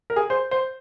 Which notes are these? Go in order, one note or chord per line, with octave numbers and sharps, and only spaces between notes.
A#4
G#4
C5
C5